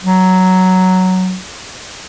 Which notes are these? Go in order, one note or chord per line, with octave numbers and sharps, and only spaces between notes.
F#3